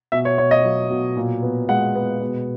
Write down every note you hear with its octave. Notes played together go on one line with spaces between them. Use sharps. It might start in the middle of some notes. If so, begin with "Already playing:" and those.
B2 E5
C#5
B2 C#5
D#5
F#3
B2
A#2
B3
G#3 F#5
B3
B2